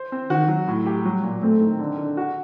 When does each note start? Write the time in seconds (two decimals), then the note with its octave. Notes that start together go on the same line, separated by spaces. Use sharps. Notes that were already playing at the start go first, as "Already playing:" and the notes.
Already playing: C5
0.12 C4
0.30 D#3 F#4
0.48 F#3
0.68 A2
0.86 G4
1.05 F#3 G3
1.23 A#2
1.42 A3 C4
1.61 D#3
1.79 D3
1.98 D3
2.17 F#4